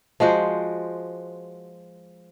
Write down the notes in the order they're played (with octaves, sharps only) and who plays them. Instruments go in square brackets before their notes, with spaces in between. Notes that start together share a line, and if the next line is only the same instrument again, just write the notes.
[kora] F3 G#3 F#4 C5